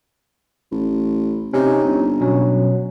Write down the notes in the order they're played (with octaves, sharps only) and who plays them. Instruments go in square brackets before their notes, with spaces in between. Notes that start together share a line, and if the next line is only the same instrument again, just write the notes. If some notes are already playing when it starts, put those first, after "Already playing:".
[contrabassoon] A1
[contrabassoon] C3 [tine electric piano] C#4 D#4
[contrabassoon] G1
[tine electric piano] B2 F#3 C#4